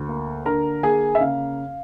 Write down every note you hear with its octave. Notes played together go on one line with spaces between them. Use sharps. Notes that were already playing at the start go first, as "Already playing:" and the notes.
Already playing: D2
A#3
D3 A#4 A#5
A#3 G#4 G#5
E5
C#3 F5